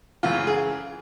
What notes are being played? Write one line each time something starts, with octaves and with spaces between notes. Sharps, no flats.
F#2 C#3 E3 F4
G#4